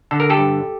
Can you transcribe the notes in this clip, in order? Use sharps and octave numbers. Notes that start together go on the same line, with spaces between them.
D3 A4
A#4
G4 A4
G2